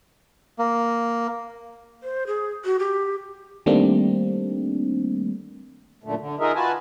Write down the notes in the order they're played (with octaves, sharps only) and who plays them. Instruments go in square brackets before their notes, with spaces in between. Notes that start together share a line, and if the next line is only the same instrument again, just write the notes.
[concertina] A#3
[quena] C5
G#4
F#4
G4
[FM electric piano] D#3 G3 A3 A#3 C4 D4
[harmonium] F#2 A#2 D3 A3
D3
D#4 F4 G#4 A#4 D#5 E5
F4 F#4 B4 G#5 A5